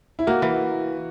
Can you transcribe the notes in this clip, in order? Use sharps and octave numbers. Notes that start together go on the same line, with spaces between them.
E4
A#3 F#4
E3